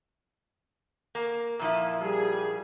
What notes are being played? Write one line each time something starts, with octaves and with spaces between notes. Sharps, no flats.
A#3
A#2 F3 E4
G3 G#4